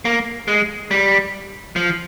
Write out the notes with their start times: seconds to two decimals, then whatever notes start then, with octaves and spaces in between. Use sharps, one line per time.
0.05 A#3
0.48 G#3
0.91 G3
1.76 F3